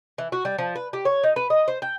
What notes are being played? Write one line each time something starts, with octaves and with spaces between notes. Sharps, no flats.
E3
F#4
G3
F3
B4
G4
C#5
D#4
B4
D#5
C5
G5